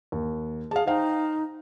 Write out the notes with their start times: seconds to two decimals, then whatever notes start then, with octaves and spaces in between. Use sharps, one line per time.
0.12 D#2
0.71 G#4 F5 A5
0.87 D#4 C5 F5 G5